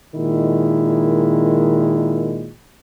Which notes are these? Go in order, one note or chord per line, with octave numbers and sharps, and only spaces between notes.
A#2 D#3 G#3 E4